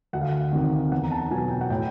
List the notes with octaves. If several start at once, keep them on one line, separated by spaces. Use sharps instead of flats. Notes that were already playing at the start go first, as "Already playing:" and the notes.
D2 F#5
F5
F#5
C3 D#3
E2 F#5
A#5
A5
B2 F#3 G#5
G5
F#5
A2 G5